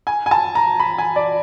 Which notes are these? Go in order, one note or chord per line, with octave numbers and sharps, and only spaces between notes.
G#5
G#5
A5
A#5
B5
G#5
D5